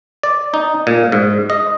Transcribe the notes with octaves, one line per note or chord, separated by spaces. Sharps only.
D5
D#4
A#2
G#2
D#5